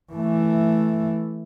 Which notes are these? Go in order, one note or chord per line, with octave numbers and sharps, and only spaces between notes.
E3 A3